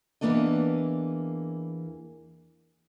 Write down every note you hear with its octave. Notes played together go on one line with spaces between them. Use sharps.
E2 G#2 E3 A#3 D4 D#5